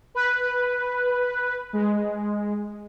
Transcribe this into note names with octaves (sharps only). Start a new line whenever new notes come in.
B4
G#3